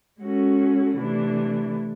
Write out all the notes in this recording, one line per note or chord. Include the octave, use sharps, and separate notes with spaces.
G#3 C#4 F#4 A4
C3 E3 A3 D4